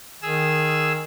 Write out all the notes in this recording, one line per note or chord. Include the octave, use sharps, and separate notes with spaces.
D#3 G#4 E6